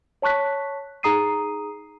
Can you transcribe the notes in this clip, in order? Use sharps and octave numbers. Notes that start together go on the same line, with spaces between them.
C#5 A5 C#6 F#6 B6
D#4 G#4 A#5 D#6 C7 D#7